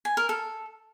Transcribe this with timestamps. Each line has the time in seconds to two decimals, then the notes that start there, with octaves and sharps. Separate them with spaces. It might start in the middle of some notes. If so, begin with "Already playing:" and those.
0.05 G#5
0.17 A#4
0.29 A4